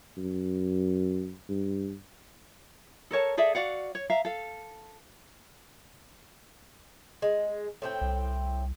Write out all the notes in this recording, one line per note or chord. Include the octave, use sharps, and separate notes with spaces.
F#2
G2
A4 A#4 C#5 A5
G#4 A4 D5 E5
F#4 D5 F5 F#5
C#5
E5 F5 A#5
A4 F5
G#3
A2 C4 G5
C2